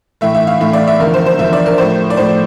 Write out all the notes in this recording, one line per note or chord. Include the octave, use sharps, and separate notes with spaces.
A2 E3 A3 E5
E5
F5
A2 E3 A3 E5
D5
E5
E2 D3 F3 A#4
C5
C5
E2 D3 F3 E5
D5
A#4
A2 F3 A3 C5
D5
A2 F3 A3 C5